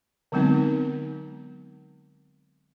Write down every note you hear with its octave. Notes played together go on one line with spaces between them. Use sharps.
D3 F#3 G#3 B3 C4 D#4